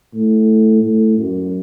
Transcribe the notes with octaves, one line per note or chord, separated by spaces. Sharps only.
A2
A2
F#2